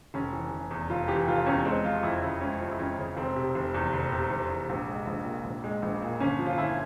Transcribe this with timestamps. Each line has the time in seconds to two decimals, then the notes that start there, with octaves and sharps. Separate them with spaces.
0.14 F1 C#4
0.33 E3
0.51 F1
0.71 E2
0.90 F1 F4
1.08 E3 G4
1.28 F1 F4
1.46 E2 C#4
1.65 G#3 C4
1.84 F3 F4
2.03 F2 E4
2.22 C#3 E4
2.41 G#3 C#4
2.60 F3
2.71 E4
2.79 F2 C#4
2.98 C#3
3.17 F1 C4
3.36 C3
3.55 F1
3.74 E2
3.93 F1
4.12 C3
4.30 F1
4.49 E2
4.69 A#1
4.88 G#3
5.07 A#1
5.25 A#2
5.44 A#1
5.64 G#3
5.82 A#1
6.02 A#2
6.20 G1 C#4
6.39 F3
6.46 F4
6.58 G1 E4